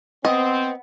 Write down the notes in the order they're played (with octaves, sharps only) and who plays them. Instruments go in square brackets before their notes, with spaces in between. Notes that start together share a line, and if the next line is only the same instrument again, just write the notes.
[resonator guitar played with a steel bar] B3 [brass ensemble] C4 [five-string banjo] D#5